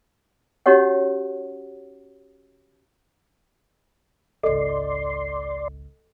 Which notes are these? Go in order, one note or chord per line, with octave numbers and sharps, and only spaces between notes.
C#4 D#4 F#4 G4 C#5 F#5
G#1 C#2 A4 D5 D#5 C6